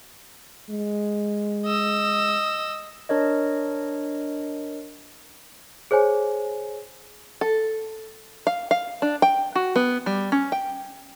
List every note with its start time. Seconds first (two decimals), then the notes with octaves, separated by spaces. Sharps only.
0.69 G#3
1.66 D#5 E6
3.09 D4 A#4 C#5 D#5
5.91 G#4 C5 C#5 G#5
7.41 A4
8.47 F5
8.71 F5
9.02 D4
9.22 G5
9.55 F#4
9.76 B3
10.06 G3
10.32 C#4
10.52 G5